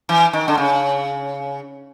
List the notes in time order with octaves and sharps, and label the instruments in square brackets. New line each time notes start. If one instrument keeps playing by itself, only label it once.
[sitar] E3
D#3
D3
C#3